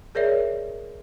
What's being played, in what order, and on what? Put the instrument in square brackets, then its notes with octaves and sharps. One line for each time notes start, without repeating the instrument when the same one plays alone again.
[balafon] G#4 A#4 C#5 D5 E5